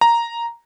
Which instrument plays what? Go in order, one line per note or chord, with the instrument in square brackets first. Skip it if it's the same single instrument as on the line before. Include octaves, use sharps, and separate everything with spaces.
[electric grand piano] A#5